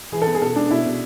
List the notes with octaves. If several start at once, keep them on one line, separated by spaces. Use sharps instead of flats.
E3 G#4
A4
B3
G#4
B2 A4
G#3 D4
B2 E4
B2